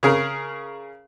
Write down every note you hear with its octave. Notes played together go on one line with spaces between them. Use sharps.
C#3 G#4 A#4